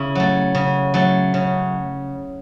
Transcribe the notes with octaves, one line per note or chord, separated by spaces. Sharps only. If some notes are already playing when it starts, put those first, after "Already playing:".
Already playing: C#3 E4
F#3 A3
C#3
F#3 A3
C#3